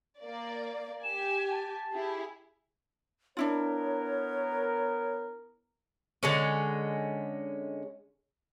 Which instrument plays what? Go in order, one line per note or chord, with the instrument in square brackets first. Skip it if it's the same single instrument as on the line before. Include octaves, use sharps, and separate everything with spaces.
[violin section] A#3 D5
[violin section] G4 G#5 [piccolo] E7
[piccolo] A5
[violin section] E4 G4 G#4
[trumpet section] B3 A#4 [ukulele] D4 E4 F4 [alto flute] C#5
[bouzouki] D3 G#3 C#4